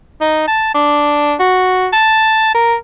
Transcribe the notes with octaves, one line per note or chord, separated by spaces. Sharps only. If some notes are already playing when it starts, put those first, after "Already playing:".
D#4
A5
D4
F#4
A5
A#4